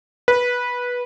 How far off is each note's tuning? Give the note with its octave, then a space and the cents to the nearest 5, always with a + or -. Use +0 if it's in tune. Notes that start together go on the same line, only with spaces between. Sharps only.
B4 -15